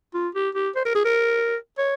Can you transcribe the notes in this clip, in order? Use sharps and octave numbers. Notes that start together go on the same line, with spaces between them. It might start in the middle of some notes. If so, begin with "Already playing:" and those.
F4
G4
G4
C5
A#4
G#4
A#4
C#5